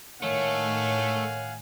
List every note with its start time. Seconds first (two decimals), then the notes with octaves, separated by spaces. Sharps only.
0.22 A2 D#3 A3 C#5 F5 F#5 G#5